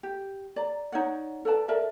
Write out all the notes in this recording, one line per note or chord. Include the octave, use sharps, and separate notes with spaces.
G4
D5 A#5
D#4 C#5 D5 F#5
A4 B4 D5 A5
A4 A#4 D5 E5